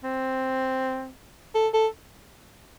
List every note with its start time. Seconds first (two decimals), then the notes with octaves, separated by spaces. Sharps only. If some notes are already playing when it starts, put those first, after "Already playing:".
0.04 C4
1.55 A4
1.74 A4